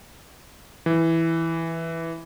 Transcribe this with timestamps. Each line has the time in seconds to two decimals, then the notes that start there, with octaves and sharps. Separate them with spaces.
0.86 E3